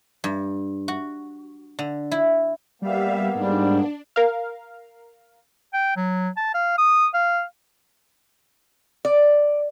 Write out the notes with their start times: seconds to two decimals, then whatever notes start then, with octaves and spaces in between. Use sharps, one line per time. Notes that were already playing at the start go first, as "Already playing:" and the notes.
0.24 G2
0.88 F#4
1.79 D3
2.11 E4
2.82 G3 A#3 B3 E5 F5
3.35 G#2 G3 D4
4.16 A#4 F5
5.73 G5
5.96 F#3
6.37 A5
6.54 F5
6.78 D#6
7.14 F5
9.05 D5